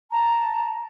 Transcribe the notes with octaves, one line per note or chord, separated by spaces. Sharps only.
A5 A#5